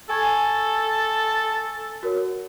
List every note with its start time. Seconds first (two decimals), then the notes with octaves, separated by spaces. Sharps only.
0.09 A4 G#5 C#6 G#6
2.03 F#4 A#4 C#5